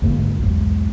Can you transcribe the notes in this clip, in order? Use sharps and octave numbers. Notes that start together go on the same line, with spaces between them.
D2 G#2 A#3
B1 E2 G#2